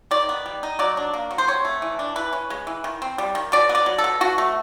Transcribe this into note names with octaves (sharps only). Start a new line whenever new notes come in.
D#3 D5
B3
G3
D#4
F#3 D5
D4
A#3
F#3
C5
C3 C#5
A3
E3
D4
E3 B4
C#4
G#3
E3
D#3
C4
G3
D#3
B2 D5
B3
D5
F#3
A4
B2
B2 F#4
A3